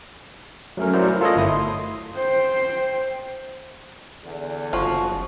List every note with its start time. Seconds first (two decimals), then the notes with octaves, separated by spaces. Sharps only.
0.77 F#3 A3 C#4 A#4
0.93 F#3 E4 C5 D5
1.08 A#4
1.21 F4 A4 C#5 D#5
1.36 G1 A3 E4 D#6
1.48 C6
2.15 C5 G5
4.23 E2 D3
4.73 F#1 F3 F#4